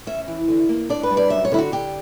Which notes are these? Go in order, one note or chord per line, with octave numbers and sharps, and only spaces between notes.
C#4 E5
E3
D3
A#3
D4 D5
B4
G3
D5
F#2 E5
C#5
D3 E4
F#4
D3 G4